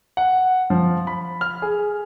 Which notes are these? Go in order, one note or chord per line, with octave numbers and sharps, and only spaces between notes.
F#5
F3
B5
F6
G#4